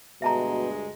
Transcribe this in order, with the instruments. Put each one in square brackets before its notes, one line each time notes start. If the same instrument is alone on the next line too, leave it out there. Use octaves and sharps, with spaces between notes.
[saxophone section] D2 G2 G#3 [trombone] B2 [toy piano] E5 A5 A#5